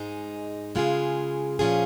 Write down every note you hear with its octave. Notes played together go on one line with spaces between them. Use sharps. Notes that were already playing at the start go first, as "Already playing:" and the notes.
Already playing: G#2 G#3 D#4
C#3 G#3 F4 G#4
A#2 F3 C#4 F4 G#4